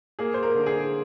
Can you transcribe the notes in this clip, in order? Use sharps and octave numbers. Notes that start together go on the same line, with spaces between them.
A#3 G#4
C5
A#4
D3
G#4